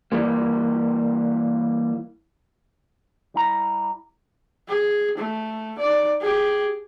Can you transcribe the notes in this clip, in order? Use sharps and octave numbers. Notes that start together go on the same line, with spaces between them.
E3 G3 A#3
G3 E4 A#5
G#4
A3
D#4 D5
G4 G#4